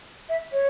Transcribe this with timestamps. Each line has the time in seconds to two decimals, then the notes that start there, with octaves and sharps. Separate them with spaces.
0.29 E5
0.53 C#5